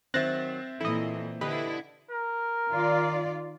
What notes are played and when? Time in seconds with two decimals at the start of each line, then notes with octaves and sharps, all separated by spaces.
0.14 D#3 F#3 C4 C5 E5 F#6 A6 A#6
0.81 A#2 E3 E4 A4 D#5
1.41 D3 E4 G4 B4 D#5
2.11 A#4
2.71 D#3 F4 D5